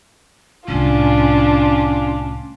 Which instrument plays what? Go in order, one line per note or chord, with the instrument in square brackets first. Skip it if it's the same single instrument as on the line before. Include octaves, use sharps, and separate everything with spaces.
[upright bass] C2 A2 [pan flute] C#4 [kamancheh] D4 F4